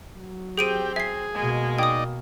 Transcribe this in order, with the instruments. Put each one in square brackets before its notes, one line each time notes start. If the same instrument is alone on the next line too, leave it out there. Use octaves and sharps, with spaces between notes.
[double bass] F#3
[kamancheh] C4 [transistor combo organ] G4 [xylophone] G#4 D7 D#7
[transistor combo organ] G#4 [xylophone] E5 C7
[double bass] B2 A#3 [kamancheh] G#3
[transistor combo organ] D#4 D5 D#5 [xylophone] G5 D#6